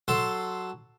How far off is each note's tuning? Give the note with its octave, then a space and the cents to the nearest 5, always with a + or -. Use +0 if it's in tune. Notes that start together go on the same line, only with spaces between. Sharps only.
F#3 +0 A4 +0 C6 +0